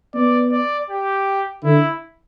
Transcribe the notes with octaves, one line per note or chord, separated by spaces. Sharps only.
B3 D5
D5
G4
D3 E4